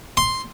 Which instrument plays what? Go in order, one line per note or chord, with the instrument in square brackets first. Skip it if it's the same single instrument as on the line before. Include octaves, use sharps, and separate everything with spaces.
[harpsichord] C6